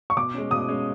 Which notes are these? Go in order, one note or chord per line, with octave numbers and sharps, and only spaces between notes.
C#6
B2 D6
G#3 C#4
B2 D#6
G#3 C#4